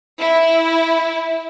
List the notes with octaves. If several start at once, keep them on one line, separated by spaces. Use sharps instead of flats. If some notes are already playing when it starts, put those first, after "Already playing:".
E4